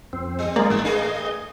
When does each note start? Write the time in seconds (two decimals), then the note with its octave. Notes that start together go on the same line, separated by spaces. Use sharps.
0.13 F2 C4
0.39 G3
0.56 G#3 A#3 G#4 D5
0.70 A1 F#2 E6
0.85 G2 A3 G#4 D#5